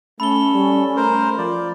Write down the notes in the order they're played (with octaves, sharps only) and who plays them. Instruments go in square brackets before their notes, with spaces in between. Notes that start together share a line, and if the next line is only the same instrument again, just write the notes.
[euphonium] A3 [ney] C#4 [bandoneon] A4 [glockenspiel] B5 G7
[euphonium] G3
[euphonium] A3 [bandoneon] A#4 C5
[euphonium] F3 [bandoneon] D5